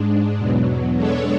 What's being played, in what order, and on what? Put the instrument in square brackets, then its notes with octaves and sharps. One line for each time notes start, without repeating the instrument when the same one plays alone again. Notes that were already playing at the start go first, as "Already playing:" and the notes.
Already playing: [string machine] G#2 G#3 D4
E2 B2 F#3
G#3 B3 D4 A4 C#5